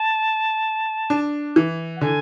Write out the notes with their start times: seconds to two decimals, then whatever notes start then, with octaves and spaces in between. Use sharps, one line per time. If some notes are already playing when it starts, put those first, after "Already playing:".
Already playing: A5
1.10 D4
1.56 E3
1.96 F#5
2.01 D3 G#5